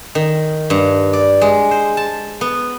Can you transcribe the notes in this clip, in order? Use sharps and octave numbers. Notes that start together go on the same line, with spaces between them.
D#3
G2
D5
G#3
C5
A5
B3